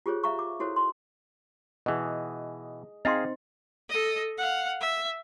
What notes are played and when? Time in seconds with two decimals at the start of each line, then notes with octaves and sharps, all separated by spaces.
0.06 F4 G4 G#4 C5 C#5
0.24 E5 F5 A#5 C#6
0.39 D6
0.60 E4 F#4 A4 C5 C#5
0.76 C6
1.86 B2 E3 G#4 D#5
3.05 C4 D#4 G#4 D#5 F5 G5 A#5 C6
3.89 A4 D#5
4.38 F5 F#5
4.81 E5